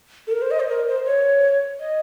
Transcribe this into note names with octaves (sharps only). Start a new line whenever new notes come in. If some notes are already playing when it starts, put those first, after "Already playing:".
A4
A#4
C5
D#5
C5
A#4
C5
C#5
D#5